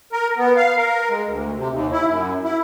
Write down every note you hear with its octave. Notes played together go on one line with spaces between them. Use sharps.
A#4
B3
F5
A#4
G#3
D2
C3
D#2
E4
F#2
E4